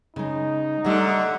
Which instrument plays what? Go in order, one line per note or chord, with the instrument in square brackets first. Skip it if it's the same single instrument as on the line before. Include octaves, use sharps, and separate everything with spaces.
[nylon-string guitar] C#3 G#3 [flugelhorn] D#4
[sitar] G#2 D3 [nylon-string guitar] G3 A3 D5 [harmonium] E5 F#5